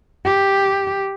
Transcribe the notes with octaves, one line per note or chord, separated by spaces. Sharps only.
G4